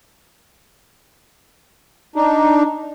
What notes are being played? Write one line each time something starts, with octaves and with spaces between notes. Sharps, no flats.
D4 D#4